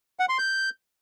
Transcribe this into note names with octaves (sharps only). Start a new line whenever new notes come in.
F#5
C6
G6